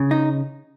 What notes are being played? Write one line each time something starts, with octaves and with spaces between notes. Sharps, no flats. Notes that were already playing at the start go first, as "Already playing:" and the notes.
Already playing: C#3
D#4